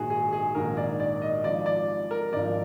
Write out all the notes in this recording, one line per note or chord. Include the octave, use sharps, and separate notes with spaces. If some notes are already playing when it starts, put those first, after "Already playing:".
Already playing: A#1 G#2 D#3 F#4 G#4
G#4
G#4
A#1 G#2 D#3 A#4
D5
D5
D#5
G#1 G#2 F3 D5
D5
A#4
G#1 G#2 F3 D5